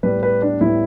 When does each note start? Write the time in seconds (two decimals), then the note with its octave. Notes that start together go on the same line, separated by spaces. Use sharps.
0.03 A2 G3 B3 B4
0.23 B4
0.42 D4
0.61 A2 G3 B3 E4